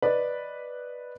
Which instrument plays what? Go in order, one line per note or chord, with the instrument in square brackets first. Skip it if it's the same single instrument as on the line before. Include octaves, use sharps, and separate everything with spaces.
[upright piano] B4 D5 D#5